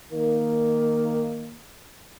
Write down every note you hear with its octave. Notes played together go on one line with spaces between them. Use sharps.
D#3 A#3